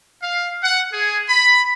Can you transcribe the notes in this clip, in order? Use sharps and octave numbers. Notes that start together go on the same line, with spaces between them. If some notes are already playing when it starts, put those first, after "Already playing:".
F5
F#5
G#4
B5